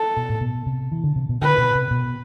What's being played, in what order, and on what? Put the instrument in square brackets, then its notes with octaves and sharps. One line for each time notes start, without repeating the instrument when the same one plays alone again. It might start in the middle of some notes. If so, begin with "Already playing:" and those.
Already playing: [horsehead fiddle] A4
[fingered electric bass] B2
A2
B2
C3
E3
D3
C3
B2
[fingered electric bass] D3 [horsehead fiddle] B4
[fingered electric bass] B2
C3
B2